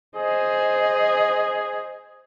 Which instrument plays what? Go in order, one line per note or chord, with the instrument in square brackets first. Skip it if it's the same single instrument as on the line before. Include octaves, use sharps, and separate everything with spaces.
[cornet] G#4 [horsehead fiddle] C5 D#5